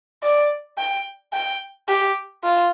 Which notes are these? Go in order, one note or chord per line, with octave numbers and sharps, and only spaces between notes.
D5
G5
G5
G4
F4